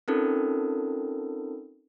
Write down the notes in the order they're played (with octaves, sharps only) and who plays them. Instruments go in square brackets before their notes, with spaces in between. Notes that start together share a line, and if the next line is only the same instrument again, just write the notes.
[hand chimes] C4 C#4 D#4 F4 A4 A#4